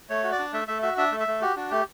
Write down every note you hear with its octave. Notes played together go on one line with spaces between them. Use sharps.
A3 C#5
F#4
D5
D4
A3 E5
A3 E5
F#4 E5
D4 E5
A3
E5
A3
F#4 G4
D4 F#4
A3 G4